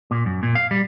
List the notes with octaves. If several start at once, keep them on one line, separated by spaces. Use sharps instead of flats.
A#2
F#2
A#2
F5
G3